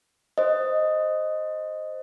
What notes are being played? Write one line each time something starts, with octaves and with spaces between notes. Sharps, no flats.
C5 D#5